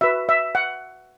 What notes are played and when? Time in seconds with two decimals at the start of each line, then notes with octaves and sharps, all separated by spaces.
0.01 F#4 B4 E5
0.29 E5
0.55 F#5